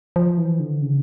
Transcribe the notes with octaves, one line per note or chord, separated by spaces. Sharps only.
F3
E3
D3
C#3